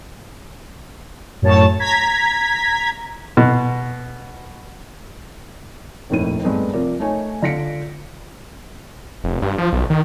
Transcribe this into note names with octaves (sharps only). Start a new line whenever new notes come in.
F#2 A2 C#5 A5
A#5 G#6 B6
B2
F1 A#1 D#2 A2 D#7
G2 G#3 A3 B3 C4
C3 F3 A#4 D5
A3 D#4 C#5 G#5
D3 F4 A#6 B6 C#7 D7
F1
G2
F3
B1
D#3